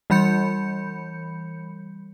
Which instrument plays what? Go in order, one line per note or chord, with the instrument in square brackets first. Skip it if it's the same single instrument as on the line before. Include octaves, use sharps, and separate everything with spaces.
[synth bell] E3 G3 B5 G6 C#7